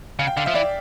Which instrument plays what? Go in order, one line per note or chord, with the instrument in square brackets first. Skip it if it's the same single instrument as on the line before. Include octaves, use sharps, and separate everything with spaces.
[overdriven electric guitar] C#3 [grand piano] F5
[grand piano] G5
[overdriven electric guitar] D3 [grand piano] F5
[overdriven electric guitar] F3 [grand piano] E5
[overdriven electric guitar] E3 [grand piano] D5